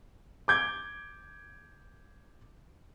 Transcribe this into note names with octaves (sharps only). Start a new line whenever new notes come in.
D6 G6 G#6